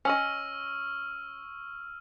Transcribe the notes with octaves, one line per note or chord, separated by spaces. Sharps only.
C#4 D#5 C#6 E6 F6